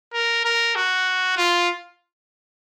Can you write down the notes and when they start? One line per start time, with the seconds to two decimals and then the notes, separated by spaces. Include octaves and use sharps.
0.14 A#4
0.45 A#4
0.75 F#4
1.37 F4